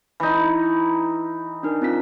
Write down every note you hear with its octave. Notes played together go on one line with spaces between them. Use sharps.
E3 D#4
D4 D#4 A#4
C4 F4 B6